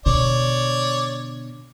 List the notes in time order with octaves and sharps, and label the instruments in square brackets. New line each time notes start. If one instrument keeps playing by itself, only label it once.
[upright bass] B2 D3 [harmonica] C#5 D5